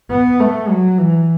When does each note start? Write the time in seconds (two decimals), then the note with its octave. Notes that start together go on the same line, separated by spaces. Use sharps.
0.11 B3
0.40 A3
0.70 F#3
0.99 E3